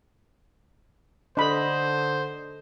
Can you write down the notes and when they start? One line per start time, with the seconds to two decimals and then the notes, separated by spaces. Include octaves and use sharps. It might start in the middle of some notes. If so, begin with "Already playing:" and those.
1.37 D3 D4 A4 C5 D#5 B5